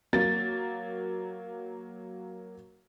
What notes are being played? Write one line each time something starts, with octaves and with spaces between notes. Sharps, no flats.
F#3 A#3 A6